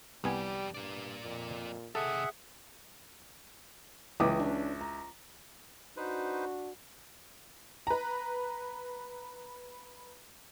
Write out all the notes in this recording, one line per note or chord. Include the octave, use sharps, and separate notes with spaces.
C2 F2 G3 B3 G4 G#5
G2 A#3 D5
F2 A#2
C3 D#3 G#4 A4 E5 F#5
C#2 E3 G5 D6 D#6
C#4 D4
A#5
D4 D#4 F#4 B4 C5
B4 A#5